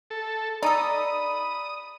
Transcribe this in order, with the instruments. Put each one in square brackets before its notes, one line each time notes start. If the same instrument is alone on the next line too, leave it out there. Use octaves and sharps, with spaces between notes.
[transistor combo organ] A4
[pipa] D#4 A4 [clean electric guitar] D5 A#5 [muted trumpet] B5 [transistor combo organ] D#6